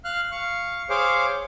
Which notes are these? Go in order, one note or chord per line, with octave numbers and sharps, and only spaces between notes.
F5 F6 F#6
F5 C#6
G#4 C5 C#5 F5 D6